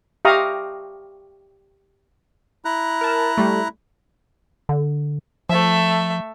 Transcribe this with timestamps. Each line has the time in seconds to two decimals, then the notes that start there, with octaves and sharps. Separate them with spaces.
0.25 G4 E5 F5 A#5 C#6 D#6
2.65 E4 A#5 F#6
3.01 A#4 A5
3.38 G3 A3
4.69 D3
5.49 F3 A3 E5